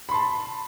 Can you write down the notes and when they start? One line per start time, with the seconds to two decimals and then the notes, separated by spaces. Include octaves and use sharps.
0.09 B5
0.11 C6
0.14 A5